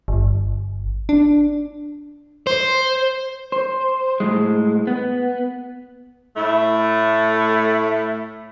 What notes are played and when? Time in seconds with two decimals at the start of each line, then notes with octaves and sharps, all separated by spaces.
0.08 G1
1.09 D4
2.47 C5
3.52 C5
4.20 A2 G#3
4.87 B3
6.35 A2 A3 E4